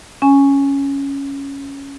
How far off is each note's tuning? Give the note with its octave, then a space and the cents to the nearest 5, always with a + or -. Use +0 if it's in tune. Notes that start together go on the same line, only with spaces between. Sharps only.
C#4 +0 G#5 +0